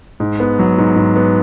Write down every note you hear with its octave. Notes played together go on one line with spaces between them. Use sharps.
G#2
B3
F#3
G#2
G#2
B3